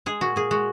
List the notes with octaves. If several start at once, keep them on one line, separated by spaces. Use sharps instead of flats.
G#3 G#4
A#2 F#4
A#2 G#4
G#3 F#4